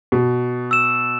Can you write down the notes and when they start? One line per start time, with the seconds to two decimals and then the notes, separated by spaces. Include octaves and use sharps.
0.12 B2
0.71 E6 E7